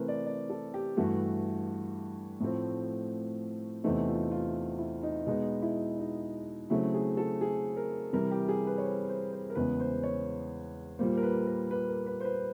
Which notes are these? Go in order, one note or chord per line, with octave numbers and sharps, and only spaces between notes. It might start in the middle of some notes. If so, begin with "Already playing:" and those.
Already playing: C3 E3 A3 C4 A#4 B4
D5
D5
A4
G4
G2 E3 A3 F#4
A2 F3 A3 C4
E2 C3 E3 A3 C4 D#4
F4
F4
E4
D#4
B2 G#3 B3 D#4
E4
D#4
C#3 F#3 A3 C4 E4
G#4
A4
G#4
A#4
C3 E3 G3 A#4
G4
G#4
B4
C#5
C5
C5
C5
A#4
E2 C#3 E3 G#3 B3 B4
C5
C#5
A#2 G3 A#3 C5
A#4
B4
A#4
B4
A#4
B4
C5
B4